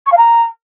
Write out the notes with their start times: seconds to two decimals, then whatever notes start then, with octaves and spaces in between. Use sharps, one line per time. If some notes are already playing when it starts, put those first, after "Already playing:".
0.06 C#6
0.12 F5
0.17 A#5